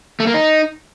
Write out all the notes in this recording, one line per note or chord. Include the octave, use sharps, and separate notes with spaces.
A3
A#3
D#4